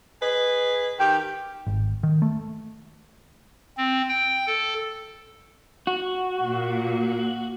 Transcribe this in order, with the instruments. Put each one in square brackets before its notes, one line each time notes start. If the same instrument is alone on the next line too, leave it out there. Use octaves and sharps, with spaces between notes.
[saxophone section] G#4 B4 D#5
[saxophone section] D#3 G4 [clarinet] G5
[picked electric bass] G#1
D#3
A3
[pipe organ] C4
G5
A4
[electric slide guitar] F#4
[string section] A#2